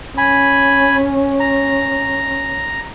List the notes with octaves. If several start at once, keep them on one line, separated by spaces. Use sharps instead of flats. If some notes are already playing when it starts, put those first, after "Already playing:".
C#4 G#5 B5
A#5